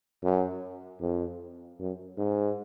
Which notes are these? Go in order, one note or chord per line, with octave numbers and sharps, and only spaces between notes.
F#2
F2
F#2
G#2